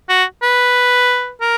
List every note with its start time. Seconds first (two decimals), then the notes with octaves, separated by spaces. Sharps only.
0.09 F#4
0.43 B4
1.41 A#4